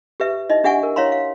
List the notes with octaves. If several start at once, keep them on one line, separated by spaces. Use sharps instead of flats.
G4 B4 E5
D#4 E4 D#5
D4 G4 E5 F#5 G#5 C#6
A#4
E4 C#5 F5 A#5 C6
F5